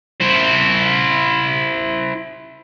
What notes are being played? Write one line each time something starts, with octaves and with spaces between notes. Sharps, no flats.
E4 C5